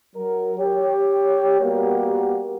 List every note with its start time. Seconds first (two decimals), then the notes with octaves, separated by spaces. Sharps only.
0.16 F#3 A#4
0.58 G4 C#5
1.60 G3 A#3 B3 F#4 G4 A#4